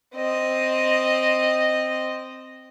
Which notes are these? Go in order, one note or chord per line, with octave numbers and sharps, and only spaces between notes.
C4 D#5